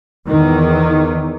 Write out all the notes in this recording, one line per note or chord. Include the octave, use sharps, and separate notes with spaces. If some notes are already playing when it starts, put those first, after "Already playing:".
E2 D#3